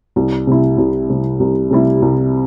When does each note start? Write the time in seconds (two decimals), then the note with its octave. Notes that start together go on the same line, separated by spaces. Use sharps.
0.16 C2
0.47 C3 G3 E4
0.78 C2
1.09 C3 G3 E4
1.40 C2
1.71 C3 G3 E4
2.02 C2